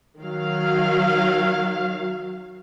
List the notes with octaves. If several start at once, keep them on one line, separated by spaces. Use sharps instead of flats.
D#3 F#3 F5